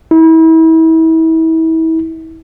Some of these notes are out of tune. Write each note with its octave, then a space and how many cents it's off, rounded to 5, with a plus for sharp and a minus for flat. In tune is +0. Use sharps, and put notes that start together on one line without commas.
E4 -35